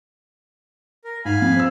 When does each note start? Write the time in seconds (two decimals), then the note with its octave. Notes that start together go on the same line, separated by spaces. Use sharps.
1.04 A#4
1.25 G#2 F5 G#5 B5
1.42 F2
1.56 C4 E6